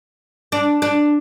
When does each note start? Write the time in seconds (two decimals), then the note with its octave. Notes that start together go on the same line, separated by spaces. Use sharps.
0.52 D4
0.82 D4